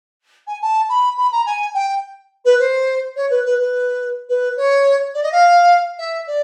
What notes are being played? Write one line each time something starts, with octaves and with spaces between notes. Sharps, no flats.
G#5
A5
B5
B5
A#5
G#5
G5
B4
C5
C#5
B4
B4
B4
B4
C#5
D5
D#5
F5
E5
D5